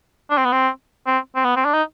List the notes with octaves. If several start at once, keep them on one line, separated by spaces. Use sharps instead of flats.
D4
C4
B3
C4
C4
C4
B3
C4
D4
D#4